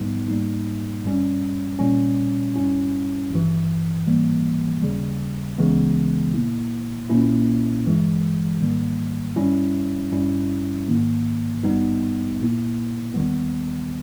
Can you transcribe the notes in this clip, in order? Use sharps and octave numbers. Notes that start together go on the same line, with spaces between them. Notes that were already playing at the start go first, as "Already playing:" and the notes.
Already playing: A#1 G#2 G3 B3 D#4
G#2 G3 A#3 D#4
G#1 G2 G3 C#4
A#2 G3 C#4
G1 G2 G3 C#4 E4
G#1 G2 E3
G#2 E3 G3 A#3
D#2 C#3 G3
C#2 C#3 E3 G#3 B3
A#1 A#2 A#3 E4
B1 A#2 A#3 C#4 E4
G1 G2 E3 G#3
G#1 G#2 D#3 G3 A#3
G2 G3 C#4 E4
G#1 G2 G3 C#4 E4
G#2 D#3 A#3
G#1 G2 G3 B3 D#4
A#1 A#2 A#3 E4
D#2 D#3 G3 B3